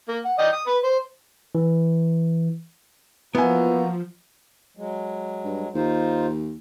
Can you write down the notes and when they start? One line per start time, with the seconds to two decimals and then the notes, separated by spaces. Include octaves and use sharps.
0.08 A#3
0.25 F#5
0.39 D5 D#5 G5
0.52 D#6
0.67 B4
0.84 C5
1.55 E3
3.35 F3 A#3 B3 E4 F#4 G#5 A#5
4.77 F#3 G#3
5.45 G2
5.75 D#2 D#4 F4 C5